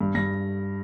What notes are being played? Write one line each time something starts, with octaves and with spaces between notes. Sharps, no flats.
G2
G2 A#6